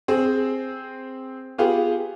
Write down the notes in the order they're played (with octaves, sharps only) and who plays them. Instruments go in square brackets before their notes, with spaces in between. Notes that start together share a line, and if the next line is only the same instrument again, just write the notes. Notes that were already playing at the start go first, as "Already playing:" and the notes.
[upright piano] C4 G#4
B3 F4 G4 G#4